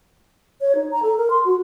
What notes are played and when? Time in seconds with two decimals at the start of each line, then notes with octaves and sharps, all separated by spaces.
0.61 C#5
0.75 D#4
0.91 A#5
1.02 A4
1.17 A#4
1.30 C6
1.45 F#4